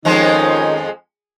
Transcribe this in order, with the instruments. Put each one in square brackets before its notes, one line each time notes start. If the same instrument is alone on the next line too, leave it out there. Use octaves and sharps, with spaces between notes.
[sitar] F2 F3 G#3 [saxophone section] D#3 C#4 D#4